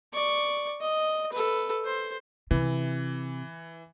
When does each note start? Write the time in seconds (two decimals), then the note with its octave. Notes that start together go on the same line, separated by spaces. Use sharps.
0.13 D5 C#6
0.81 D#5
1.32 A4 B4
1.85 C5
2.51 C3 E3